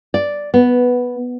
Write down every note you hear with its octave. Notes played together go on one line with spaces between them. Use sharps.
D5
B3